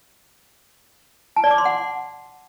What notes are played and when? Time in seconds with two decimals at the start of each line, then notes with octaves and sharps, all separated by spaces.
1.36 A5
1.44 D5
1.51 D6
1.58 C6
1.65 F#5